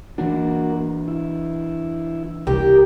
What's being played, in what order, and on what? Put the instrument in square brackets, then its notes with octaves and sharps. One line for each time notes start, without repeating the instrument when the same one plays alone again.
[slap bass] E3 D4 [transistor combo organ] A#3 F#4
[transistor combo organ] E4
[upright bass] C2 [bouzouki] G4 [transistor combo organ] A#4 G5